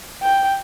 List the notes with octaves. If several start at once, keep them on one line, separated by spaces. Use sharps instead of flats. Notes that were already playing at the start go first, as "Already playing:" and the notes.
G5